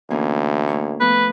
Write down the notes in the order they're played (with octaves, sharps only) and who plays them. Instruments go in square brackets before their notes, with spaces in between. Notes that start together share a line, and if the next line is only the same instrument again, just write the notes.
[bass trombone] D2 [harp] E3 A#3 C#4
[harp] A2 A#3 C#6
[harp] F3 A3 B3 [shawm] B4